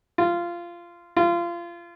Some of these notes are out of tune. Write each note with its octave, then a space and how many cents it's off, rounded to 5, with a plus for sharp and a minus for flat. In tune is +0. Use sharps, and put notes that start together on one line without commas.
F4 -15
F4 -25